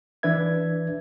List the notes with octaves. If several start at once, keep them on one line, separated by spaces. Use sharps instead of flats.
E3 D4 B4 E5 G#6